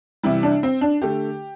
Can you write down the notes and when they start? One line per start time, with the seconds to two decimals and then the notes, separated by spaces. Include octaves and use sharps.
0.23 C3 E3 G3 E4
0.43 D4
0.63 C4
0.81 D4
1.02 D3 A3 G4